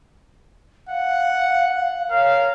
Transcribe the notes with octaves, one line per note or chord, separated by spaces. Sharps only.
F5 F#5
A#4 C#5 F5